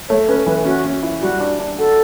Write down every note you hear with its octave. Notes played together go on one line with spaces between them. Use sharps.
A3 C#5
C#4 B4
E3 B4
C#4 F#4
C#4
E4
G3 F#4
D4
D4
F#4 A4